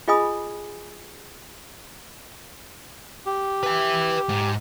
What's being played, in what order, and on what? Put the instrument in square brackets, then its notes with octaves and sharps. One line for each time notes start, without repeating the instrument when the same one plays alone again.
[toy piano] F4 G#4 D#5 G#5 B5 D#6
[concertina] G4
[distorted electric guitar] B4 E5
G#2